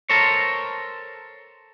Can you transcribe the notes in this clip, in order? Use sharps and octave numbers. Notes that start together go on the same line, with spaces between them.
A4 A#4 C5 C#5